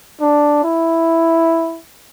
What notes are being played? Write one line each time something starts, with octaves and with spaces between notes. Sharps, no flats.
D4
E4